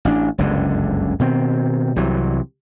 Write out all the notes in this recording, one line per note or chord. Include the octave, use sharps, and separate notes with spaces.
A1 D4
F#1 C#2 G2 D3
B2 D#3 C4
C2 C3 E3 F#3